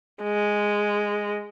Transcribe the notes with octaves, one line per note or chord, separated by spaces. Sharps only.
G#3